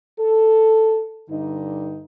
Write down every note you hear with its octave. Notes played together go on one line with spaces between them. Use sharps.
A4
G2 D3 D#4